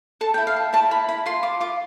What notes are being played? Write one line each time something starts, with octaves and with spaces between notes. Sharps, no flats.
A4 A5
E4 G5
F5
A4
E4 A5
E4 B5
E4 B5
F4 C6
F4 D6
F4 D6